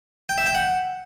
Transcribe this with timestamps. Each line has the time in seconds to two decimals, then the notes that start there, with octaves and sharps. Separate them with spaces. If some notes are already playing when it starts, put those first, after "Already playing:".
0.29 G5
0.38 E5
0.46 G5
0.55 F#5